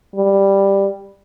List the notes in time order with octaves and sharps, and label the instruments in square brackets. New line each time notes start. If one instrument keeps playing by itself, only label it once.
[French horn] G3